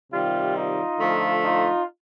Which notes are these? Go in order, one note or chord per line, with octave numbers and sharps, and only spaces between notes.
C3 D#3 G3 F4 G4
D#4 F4
D3 F3 A3
D#4 F4